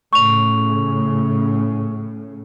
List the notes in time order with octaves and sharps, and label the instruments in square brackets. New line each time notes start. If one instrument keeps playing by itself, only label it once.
[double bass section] A2 C#3 [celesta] C#6 F7